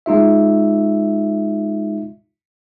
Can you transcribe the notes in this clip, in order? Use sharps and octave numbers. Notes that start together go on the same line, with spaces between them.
G#3 D#4 F4 E5